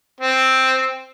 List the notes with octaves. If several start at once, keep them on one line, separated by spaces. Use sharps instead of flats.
C4